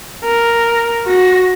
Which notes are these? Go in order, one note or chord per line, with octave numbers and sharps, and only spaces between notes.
A#4
F#4 A#6